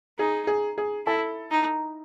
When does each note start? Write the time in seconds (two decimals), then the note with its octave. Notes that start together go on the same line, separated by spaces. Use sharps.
0.19 D#4 G#4
0.47 G#4
0.78 G#4
1.06 E4 A4
1.51 D#4